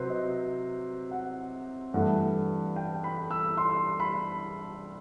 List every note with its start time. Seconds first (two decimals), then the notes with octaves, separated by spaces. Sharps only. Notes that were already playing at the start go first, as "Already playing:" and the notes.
Already playing: C3 F#3 B4 C5
0.09 D#5
1.11 F#5
1.94 G2 E3 A3 F#5
2.76 G5
3.04 B5
3.31 E6
3.57 C6
4.00 B5